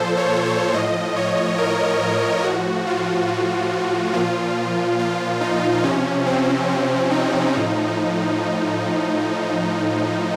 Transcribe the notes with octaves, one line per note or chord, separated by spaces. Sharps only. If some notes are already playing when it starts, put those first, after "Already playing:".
Already playing: A#2 F3 A4 C5
C#5
C#5
A2 F3 D#5
C#5
A#4
A2 F3 F#4
F4
A#2 F3 F4
F4
D#4
C3 F3 C#4
C4
C#4
D#4
A2 F3